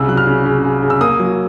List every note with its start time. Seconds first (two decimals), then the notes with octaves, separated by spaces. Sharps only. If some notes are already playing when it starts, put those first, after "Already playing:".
Already playing: C2 C#3 E6
0.08 F#3 F#6
0.17 F6
0.27 C#3
0.46 C#3
0.64 C#3
0.83 C#3
0.90 E6
1.01 A#3 D#6
1.20 F#3